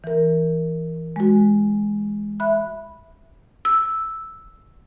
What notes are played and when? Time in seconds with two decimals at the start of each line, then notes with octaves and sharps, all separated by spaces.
0.04 E3 A#4
1.16 G#3 F#4
2.40 E5 B5 F#6
3.65 E6